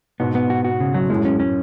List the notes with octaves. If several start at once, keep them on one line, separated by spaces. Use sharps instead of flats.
G#2 B2 B3
B3
F#4
F#4
C#3
F#3
F#2 A2 G#3
C#4
C#4